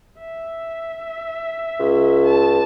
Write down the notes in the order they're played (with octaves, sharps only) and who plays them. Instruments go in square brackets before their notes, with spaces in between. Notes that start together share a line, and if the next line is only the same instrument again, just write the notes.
[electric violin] E5
[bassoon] C#2
[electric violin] A5